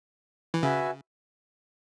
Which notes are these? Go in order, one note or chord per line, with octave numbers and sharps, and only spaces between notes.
E3
C#3 F#4 B4 E5 G#5